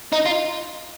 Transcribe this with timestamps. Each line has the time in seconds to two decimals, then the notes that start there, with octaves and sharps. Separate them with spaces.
0.12 D#4
0.25 F4